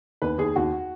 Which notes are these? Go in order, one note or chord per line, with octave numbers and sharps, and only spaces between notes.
D#2 B4
D#2 G#4
D#2 F#4